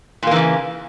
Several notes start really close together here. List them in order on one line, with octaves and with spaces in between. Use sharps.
A#2 A#3 E3 C#3